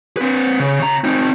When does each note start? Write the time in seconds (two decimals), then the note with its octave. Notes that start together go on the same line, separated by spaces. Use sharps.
0.17 C4 B4
0.60 C#3
0.80 C#3 A#5
1.04 C4 D#4